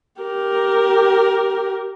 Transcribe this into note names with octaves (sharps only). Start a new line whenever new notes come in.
G4 A#4